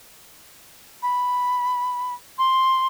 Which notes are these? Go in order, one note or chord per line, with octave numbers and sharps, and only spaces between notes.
B5
C6